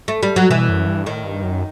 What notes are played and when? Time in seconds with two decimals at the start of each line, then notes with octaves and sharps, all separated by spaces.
0.08 A3
0.23 G3
0.36 F#3
0.50 B2 E3
0.69 F#2
0.87 G2
1.06 A2 D#3
1.24 G2
1.43 F#2